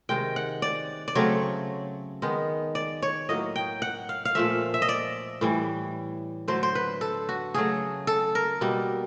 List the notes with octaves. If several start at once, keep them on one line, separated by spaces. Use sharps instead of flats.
C3 D#3 G#3 G5
F#5
D5
D5
C#3 F#3 A3 C4 C#5
D#3 G#3 B3
D5
C#5
A2 F#3 A#3 D#5
G5
F#5
F5
F5
A#2 F3 A3 E5
E5
D#5
D5
A2 E3 G3
D3 F#3 A3 C5
C5
B4
A4
F#4
C#3 F#3 A3 G#4
A4
A#4
B2 G3 A#3